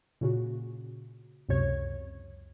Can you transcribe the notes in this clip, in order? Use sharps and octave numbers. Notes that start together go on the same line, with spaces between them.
A#2 C#3 F#4
C#2 F#2 C3 C#5 G#6